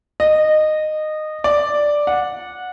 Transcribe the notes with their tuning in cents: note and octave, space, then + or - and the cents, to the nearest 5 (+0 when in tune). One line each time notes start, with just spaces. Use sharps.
D#5 -15
D5 +0
F#5 -15